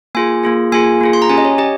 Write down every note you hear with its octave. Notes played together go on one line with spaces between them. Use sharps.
A#3 F4 G#4 G#5
A#3 F4 G#4
A#3 F4 G#4 G#5
A#3 F4 G#4
C6
A#5
C#4 G4 G#5
D#5
C#5
G4 D#5